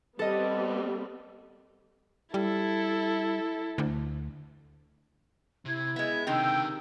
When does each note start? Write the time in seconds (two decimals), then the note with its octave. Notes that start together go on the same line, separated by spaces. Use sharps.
0.19 G3 B3 C4 A4 D#5
2.34 G3 E4 A4
3.78 D2
5.65 C3 E4 G#6
5.96 G#3 B3 E5
6.27 C#2 C3 D#3 D4 G5 E6